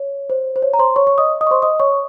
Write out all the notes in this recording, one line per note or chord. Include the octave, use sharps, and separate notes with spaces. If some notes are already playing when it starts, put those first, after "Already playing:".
Already playing: C#5
C5
C5
C#5
A#5
C5 C6
C#5 C#6
C#5 C#6
D#5 D#6
D#5 D#6
C#6
C5 C6
D#5 D#6
C#5 C#6